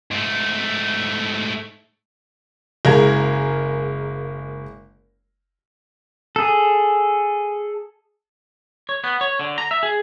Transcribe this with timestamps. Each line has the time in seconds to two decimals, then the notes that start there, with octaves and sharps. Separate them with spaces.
0.11 G#2 A3
2.85 F#1 G#3 A#4 F5 A#5 G#6
6.36 G#4 A4
8.89 C#5
9.04 B3
9.21 C#5
9.39 D3
9.58 A#5
9.71 E5
9.83 G#4